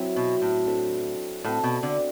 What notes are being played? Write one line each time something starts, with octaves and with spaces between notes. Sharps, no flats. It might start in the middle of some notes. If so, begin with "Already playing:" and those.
Already playing: F#3 C4 E4
B2
A2
D4 A4 C5 E5
A2 C4 F#4 A4 D5
B2
D3